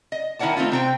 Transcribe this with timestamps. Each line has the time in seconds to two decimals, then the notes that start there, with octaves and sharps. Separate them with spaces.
0.12 D#5
0.39 D#3 E4 A#4 C#5 F#5 A5
0.57 A3 C4 D#4 F4
0.72 C3 C4 G5